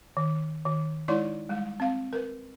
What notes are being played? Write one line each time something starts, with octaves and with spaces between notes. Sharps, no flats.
D#3
D#3
G#3 D#4 E4 C#5 D5 C6
G3 G#3
C4 F5
A#4 B4